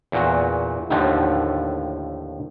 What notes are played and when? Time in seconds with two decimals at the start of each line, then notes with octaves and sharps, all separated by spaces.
0.12 E2 A#2 F#4
0.90 D#2 A2 D3 D#3 F3 A3